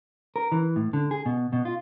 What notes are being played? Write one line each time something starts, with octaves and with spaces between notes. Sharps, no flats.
A#4
E3
A2
D3
G#4
B2
B2
F4